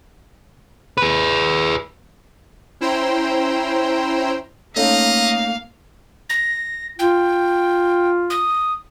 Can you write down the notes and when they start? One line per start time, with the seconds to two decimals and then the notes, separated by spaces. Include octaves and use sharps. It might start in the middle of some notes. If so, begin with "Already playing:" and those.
0.98 G#4 B4
2.81 C#4 E4 C5 G5 A#5 C6
4.76 A3 A#3 C#4 D#4 D#5 F5
6.30 A#6
6.99 F4 G5
8.30 D#6